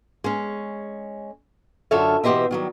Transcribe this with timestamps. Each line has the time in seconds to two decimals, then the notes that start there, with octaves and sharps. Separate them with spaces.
0.24 G#3 C#4
1.91 F#2 D3 F4 A4 C#5 E5
2.24 B2 E3 G4 C5 D#5 E5
2.51 D#3 F#3 G3